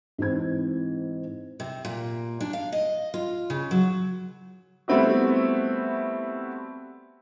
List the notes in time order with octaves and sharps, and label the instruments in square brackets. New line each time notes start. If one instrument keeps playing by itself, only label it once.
[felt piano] G#2 E3 C4 G#6
[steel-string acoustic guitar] C3
A#2
D4
F5
D#5
F4
C#3
F#3
[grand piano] G3 A3 B3 C4 E4 F#4